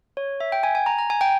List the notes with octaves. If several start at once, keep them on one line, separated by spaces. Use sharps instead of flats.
C#5
E5
G5
G#5
G#5
A#5
A#5
G#5
G5